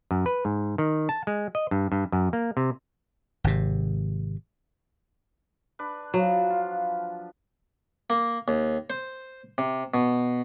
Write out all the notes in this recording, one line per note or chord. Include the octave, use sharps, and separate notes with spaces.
F#2
B4
G#2
D#3
A5
G#3
D#5
G2
G2
F#2
A#3
C3
G#1 C3
D4 B4
F3 F#3
F4
A#3
D#2
C5
C3
B2